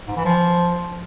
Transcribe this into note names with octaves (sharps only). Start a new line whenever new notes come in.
G#2
E3
F3